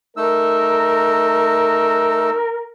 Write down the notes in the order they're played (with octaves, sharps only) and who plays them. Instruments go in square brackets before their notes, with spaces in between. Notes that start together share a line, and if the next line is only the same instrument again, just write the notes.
[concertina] A3 D#4 E6 [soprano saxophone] A#4